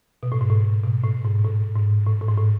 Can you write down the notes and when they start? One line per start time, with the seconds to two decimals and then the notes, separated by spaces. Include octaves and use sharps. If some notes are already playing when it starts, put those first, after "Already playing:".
0.23 B2
0.32 A2
0.41 G#2
0.50 A2
0.84 B2
1.04 A2
1.24 G#2
1.44 A2
1.76 G#2
2.06 A2
2.22 A2
2.29 G#2
2.37 A2